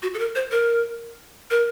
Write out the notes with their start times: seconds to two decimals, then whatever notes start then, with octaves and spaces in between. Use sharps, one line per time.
0.03 F#4
0.14 A4
0.19 A#4
0.35 C5
0.52 A#4
1.51 A#4